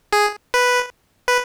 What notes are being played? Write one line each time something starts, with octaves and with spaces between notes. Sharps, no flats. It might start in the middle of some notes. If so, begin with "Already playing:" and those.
G#4
B4
B4